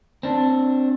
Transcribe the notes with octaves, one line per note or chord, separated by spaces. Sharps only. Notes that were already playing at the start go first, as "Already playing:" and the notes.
C4 D4